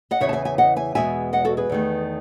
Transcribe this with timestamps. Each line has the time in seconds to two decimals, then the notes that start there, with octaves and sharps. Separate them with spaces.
0.11 D#5 F#5
0.20 E2 C#3 E3 C#5 E5
0.29 A5
0.33 E5 G#5
0.45 E5 G#5
0.58 D#5 F#5
0.76 E5 G#5
0.95 E2 B2 G#3 E5 G#5
1.33 D#5 F#5
1.45 F#4 A4
1.57 G#4 B4
1.69 E2 D#3 A3